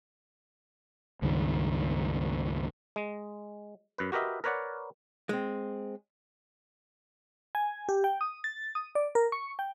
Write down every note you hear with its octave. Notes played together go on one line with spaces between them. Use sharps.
C#2 G2 D#3
G#3
F#2 B4
F#4 G4 A#4 B4 D#5 E5
A#4 B4 C#5 D5 F#5
G#3 C4
G#5
G4
G5
D#6
A6
D#6
D5
A#4
C#6
G5